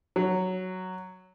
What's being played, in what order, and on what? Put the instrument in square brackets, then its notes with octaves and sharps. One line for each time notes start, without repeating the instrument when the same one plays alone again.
[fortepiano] F#3